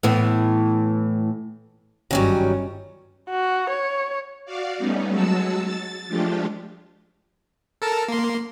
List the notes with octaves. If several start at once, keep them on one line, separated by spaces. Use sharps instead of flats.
A2 E3 B3
G1 D#3 F#3 G3 C#4
F#4
C#5
F#4 D5 F5
G3 A3 B3 C#4 D#4
F#3 G#3 F#4 A5 E6
A6
F3 G#3 A3 D4 F4 G4
A4 A#4 A5
A#3 C6